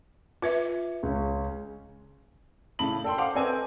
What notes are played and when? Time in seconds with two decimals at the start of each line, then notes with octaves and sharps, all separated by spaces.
0.42 F4 B4 E5
1.03 C#2 C#4
2.79 A2 C#3 A5 B5 F#7
3.04 A4 G5 C6
3.18 C5 F5 F#5 C6 D6
3.35 C4 A4 B4 C5 D#5 G#5